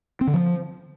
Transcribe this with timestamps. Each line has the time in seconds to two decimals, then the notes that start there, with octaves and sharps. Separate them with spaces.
0.21 C4
0.27 D3
0.34 F3